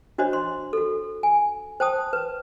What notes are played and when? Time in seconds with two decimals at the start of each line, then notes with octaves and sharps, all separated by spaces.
0.18 D4 F#4 C5 C#5 D#5
0.33 C6
0.73 F#4 A4
1.23 G#5
1.80 C5 G5 A5 D#6
2.13 B4